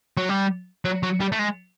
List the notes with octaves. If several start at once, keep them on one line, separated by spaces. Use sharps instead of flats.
F#3
G3
F#3
F#3
G3
A3
G#3